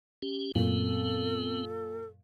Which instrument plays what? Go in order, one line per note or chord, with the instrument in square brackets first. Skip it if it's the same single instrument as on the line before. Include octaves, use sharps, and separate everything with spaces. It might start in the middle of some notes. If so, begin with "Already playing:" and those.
[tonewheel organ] C#4 G4
[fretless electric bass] F#2 [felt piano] A#2 [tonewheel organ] B3 C4 [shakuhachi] A4